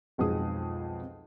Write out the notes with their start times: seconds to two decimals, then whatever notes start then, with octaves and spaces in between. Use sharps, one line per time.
0.18 B1 F2 G#3 G#4 D#6